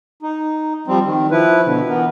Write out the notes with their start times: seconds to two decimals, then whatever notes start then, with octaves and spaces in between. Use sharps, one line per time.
0.23 D#4
0.87 F3 G3 C4
1.05 D#3
1.31 F3 E4 B4
1.65 B2 D3
1.89 E3 B3 A#4